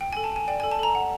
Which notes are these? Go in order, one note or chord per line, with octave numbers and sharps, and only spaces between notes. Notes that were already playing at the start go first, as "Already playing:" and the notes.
G5
G#5
A4
A5
G5 G#5
D5 G5
G#5
A4
A5
A4 A#5
F#5